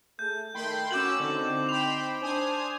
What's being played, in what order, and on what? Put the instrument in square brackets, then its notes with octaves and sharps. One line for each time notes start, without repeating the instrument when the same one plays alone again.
[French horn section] A3 G#4 [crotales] G6
[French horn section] D#3 A3 [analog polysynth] G5 B5 C6
[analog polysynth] C#4 E6 [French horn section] F#4 [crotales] D6 G6 F#7
[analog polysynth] D3 [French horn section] C4 D#4
[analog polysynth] G5 B5 C6 [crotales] F7
[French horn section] D4 [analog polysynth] C5 G#5 D#6